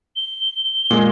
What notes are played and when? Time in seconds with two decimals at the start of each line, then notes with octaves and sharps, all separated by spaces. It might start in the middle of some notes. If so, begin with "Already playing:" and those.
0.16 G7
0.64 G7
0.91 A#2 G#3